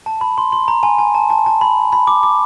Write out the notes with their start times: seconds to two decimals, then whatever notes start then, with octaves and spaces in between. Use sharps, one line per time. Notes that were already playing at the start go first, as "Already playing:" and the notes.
0.06 A5
0.21 B5
0.38 C6
0.52 C6
0.68 A#5
0.83 G#5
0.99 G#5
1.14 A5
1.30 A5
1.46 A5
1.61 B5
1.92 B5
2.07 D6
2.23 D6